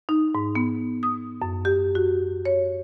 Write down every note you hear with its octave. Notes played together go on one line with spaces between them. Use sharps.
D#4
G#2
B3
D#6
F#2
G4
F#4
C#5